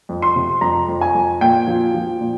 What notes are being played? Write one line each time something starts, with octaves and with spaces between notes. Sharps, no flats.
F2
C6
C3
F2 A#5
F2
G#5
F2
A#2 G5
F3
F3
A#2